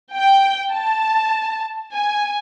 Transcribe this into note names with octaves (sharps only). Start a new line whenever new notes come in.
G5
A5
G#5